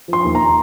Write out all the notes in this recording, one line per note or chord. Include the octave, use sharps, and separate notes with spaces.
F3
C6
D#2
A#5